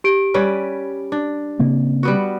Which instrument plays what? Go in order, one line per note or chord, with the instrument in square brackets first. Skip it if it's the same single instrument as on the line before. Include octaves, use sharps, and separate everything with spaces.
[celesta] G4 D7
[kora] G3 C#4 B4
D4
[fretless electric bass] C#3 A#3 C4
[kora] G3 B3 F#4